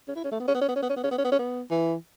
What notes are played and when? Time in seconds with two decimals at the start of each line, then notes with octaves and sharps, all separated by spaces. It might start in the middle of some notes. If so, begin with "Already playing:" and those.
0.08 C#4
0.16 E4
0.24 C#4
0.32 A3
0.40 B3
0.48 C#4
0.54 B3
0.61 C#4
0.68 B3
0.76 C#4
0.82 B3
0.90 C#4
0.96 B3
1.04 C#4
1.11 B3
1.18 C#4
1.25 B3
1.32 C#4
1.39 B3
1.71 E3